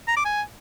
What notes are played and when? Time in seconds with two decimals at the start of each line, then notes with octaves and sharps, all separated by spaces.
0.08 A#5
0.16 D6
0.25 G#5